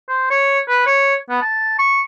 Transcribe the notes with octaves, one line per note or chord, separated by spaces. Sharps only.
C5
C#5
B4
C#5
B3
A5
C#6